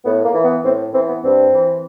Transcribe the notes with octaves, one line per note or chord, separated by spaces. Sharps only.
A2 B3
A#3
E3
B3
A2 C4
E3 C4
B3
G2 C4
E3